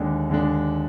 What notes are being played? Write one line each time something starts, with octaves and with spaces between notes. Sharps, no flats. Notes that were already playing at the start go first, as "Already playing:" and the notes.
Already playing: D#2 D3 G#3 D4
D#2 D3 G#3 D4